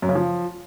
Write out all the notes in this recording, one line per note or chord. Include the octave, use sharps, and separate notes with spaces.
F#2
C#3
F3